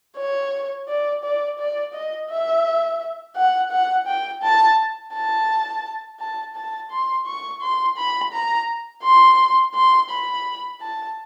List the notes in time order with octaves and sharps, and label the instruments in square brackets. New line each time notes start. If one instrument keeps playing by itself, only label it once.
[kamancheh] C#5
D5
D5
D5
D#5
E5
F#5
F#5
G5
A5
A5
A5
A5
C6
C#6
C6
B5
A#5
C6
C6
B5
A5